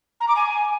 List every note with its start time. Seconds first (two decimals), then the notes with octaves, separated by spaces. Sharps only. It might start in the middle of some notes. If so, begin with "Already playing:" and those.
0.20 A#5
0.28 D6
0.36 G#5